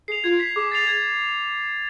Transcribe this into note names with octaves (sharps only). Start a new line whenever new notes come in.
G#4 C7 F7
F4 G#6
B6 F7
G#4 D6
A6 C7 F7
G#6